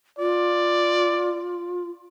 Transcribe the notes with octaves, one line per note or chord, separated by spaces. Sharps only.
F4 D5